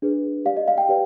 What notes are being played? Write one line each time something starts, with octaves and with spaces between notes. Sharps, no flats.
D4 G#4 B4
G4 D5 F5
D#5
F5
G5
G4 B4 D5